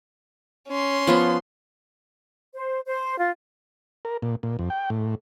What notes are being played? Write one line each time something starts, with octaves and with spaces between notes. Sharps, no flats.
C#4 C6
F3 B3 F4
C5
C5
F4
A#4
A#2
A#2
F2
G5
A2